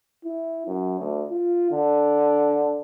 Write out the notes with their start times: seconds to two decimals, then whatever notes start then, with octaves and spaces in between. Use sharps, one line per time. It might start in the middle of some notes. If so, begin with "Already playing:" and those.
0.25 E4
0.67 F#2
1.00 D2
1.31 F4
1.71 D3